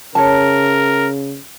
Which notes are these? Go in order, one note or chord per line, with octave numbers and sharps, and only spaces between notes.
C#3 A#4 C#5 A5